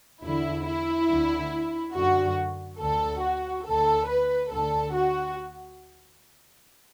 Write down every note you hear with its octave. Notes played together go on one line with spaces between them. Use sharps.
E2 D3 E4
E4
D2 D3
F#2 D3 F#4
D2 D3 A4
F#4
D2 D3 A4
B4
D2 D3 A4
F#4